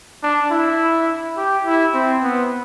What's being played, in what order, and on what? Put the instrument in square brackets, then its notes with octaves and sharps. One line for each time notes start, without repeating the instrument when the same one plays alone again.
[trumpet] D4
E4
G4
E4
C4
B3